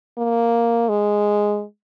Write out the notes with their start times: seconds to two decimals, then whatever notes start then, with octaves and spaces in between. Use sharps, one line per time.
0.18 A#3
0.89 G#3